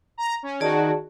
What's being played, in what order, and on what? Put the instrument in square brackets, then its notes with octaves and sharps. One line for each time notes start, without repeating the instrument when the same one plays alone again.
[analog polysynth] A#5
C#4
[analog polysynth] D#3 F#4 [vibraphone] G#4 D5 A5